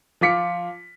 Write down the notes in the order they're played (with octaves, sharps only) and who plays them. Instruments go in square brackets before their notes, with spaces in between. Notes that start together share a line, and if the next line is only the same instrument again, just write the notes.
[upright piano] F3 F4 D6 B6 C#7